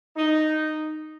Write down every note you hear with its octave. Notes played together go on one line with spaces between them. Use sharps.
D#4